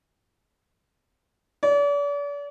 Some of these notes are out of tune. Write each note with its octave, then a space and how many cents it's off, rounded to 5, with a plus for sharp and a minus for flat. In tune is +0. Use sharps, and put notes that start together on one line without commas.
D5 -40